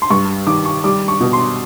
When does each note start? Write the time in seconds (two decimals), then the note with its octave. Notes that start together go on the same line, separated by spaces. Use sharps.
0.02 C6
0.10 G2 C#6
0.47 D#3 D6
0.66 C#6
0.84 G3 D6
1.08 C#6
1.20 B2
1.33 C6